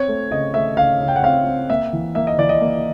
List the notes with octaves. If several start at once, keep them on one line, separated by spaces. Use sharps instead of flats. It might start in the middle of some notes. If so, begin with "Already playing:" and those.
Already playing: C4 C#5
A3
C#3 D#5
A3 E5
C#3 F5
C#3
G5
F#5
C4 F5
C4
A#3 E5
E3
A#3 E5
D#5
E3 D5
D#5
A#3